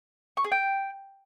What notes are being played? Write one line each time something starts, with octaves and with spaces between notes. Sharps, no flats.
C#6
G#4
G5